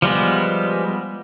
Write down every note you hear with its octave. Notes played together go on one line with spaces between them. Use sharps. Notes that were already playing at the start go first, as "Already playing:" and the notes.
F3 G3 G#3 B3